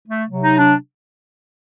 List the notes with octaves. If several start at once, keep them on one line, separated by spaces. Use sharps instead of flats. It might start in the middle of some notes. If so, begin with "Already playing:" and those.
A3
C3 F#3
D#4
D4